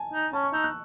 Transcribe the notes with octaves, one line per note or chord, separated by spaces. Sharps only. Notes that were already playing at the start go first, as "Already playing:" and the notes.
Already playing: G#5 A5
D#4
C#4 A5
C#6
D#4 E6
F#6